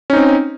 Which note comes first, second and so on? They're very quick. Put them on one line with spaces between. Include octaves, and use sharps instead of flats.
C#4 D#4 C4